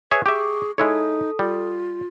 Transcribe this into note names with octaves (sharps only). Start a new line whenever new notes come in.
G#4 B4 C#5 E5
G4 G#4 E5 C#6 D6
G#3 D#4 E4 A4 C#5 D#6
G3 F4